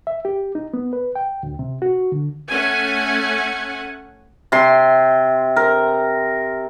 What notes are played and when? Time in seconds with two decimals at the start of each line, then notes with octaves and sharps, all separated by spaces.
0.07 E5
0.25 G4
0.55 D#4
0.74 B3
0.93 B4
1.15 G5
1.43 D2
1.59 C3
1.82 F#4
2.12 D3
2.49 A3 C#4 F#5 G#5
4.52 C3 C6
5.56 A#4